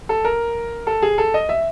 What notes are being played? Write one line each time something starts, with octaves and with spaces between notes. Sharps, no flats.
A4
A#4
A4
G#4
A4
D#5
E5